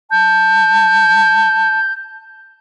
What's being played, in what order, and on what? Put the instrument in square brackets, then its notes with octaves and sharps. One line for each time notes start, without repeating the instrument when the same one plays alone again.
[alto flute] A5 [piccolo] G6